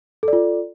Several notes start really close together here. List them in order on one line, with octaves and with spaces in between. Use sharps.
A4 D5 F4